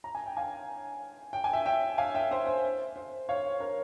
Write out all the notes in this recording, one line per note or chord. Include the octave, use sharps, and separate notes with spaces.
A#5
G#5
G5
F5 G#5
G5
G#5
E5 G5
E5 G5
F5 G#5
E5 G5
C5 E5
C5
C5
C#5 F5
A#4 C#5